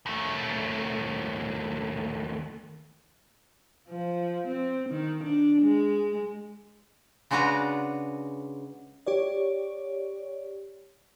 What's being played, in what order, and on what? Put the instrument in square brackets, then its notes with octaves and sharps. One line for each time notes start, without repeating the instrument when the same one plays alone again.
[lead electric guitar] D#2 A3
[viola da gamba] F3
C4
D#3
D4
G#3
[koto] C#3 G#3 D4 F#4 B4 A#5
[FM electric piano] G4 C#5 D5